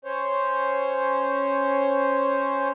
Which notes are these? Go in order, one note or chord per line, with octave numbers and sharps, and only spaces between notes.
C#4 C5 C#5